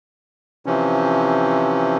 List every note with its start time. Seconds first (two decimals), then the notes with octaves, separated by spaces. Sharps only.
0.66 C3 E3 F3 C#4